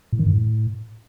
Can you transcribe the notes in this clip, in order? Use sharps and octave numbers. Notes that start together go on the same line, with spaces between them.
A2
D#3
G2
A2